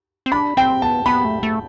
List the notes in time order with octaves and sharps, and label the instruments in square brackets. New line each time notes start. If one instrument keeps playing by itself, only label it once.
[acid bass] C4
[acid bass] D4 [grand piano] B5
[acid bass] C4 [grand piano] G5
[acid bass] B3 [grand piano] A5
[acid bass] B3 [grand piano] B5
[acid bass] A3
A3